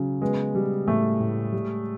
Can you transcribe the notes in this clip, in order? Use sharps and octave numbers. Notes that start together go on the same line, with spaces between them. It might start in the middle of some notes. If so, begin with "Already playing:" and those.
Already playing: C#3 F#3
G#3 B3
G3
A2 A3
A2
G3